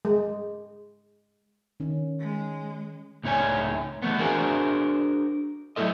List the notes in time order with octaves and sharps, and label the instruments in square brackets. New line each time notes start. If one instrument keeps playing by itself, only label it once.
[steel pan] G#3
[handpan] D#3 C#4
[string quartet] G#3
[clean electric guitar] C#2 A2 D#4 C#5 G#5
E3 A3 B3
D4 F#4 G#4 A#4 C5 G#5
F#3 A3 C4 E4 A4 D#5